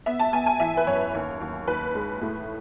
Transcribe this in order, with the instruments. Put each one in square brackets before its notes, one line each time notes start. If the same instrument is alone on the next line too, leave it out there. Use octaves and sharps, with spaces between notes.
[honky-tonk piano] B3 E5
A5
B3 G#5
G#5
E3 E5
B4
F#2 C#5
D#2
D#2
D#2 B4
G#3
A2